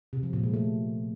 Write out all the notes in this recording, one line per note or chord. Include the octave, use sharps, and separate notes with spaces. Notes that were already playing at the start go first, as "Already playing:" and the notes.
C3
F3
A#2
G#3
A3